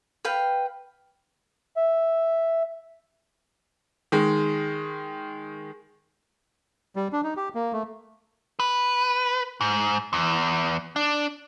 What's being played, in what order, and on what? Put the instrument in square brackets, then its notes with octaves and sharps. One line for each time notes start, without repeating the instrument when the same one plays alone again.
[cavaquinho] B4 F5 G5
[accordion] E5
[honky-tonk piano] D#3 G#3
[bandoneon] G3
D4
D#4
G4
A#3
A3
[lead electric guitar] B4
G#2
E2
D4